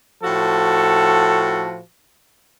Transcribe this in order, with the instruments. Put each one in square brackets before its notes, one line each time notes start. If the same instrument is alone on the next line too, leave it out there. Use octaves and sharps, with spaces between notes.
[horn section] A2 F3 F#4 A4